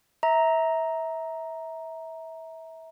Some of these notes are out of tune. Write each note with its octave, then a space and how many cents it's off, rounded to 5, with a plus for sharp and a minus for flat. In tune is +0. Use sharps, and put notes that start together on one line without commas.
E5 -25 A#5 +0